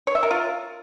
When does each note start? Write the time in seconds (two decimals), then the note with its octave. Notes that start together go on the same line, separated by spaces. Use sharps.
0.07 C#5
0.15 E5
0.23 A#4
0.31 F4